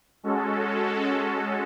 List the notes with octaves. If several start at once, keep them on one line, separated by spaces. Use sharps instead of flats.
G#3 C#4 F#4 A4